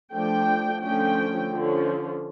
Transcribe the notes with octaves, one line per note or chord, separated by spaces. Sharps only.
F3 A3 D4 G5
D3 F3 A3 C#4 G5
D3 F3 C#4